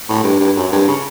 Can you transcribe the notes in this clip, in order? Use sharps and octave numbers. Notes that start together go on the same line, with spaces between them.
A2
G2
G2
F#2
G2
C#3